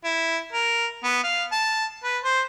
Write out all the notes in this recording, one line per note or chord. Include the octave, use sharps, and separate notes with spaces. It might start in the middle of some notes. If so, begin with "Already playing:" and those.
E4
A#4
B3
F5
A5
B4
C5